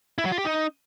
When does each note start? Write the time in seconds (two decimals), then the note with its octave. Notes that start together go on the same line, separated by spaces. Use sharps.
0.18 E4
0.25 F#3
0.32 F4
0.38 G4
0.45 D#4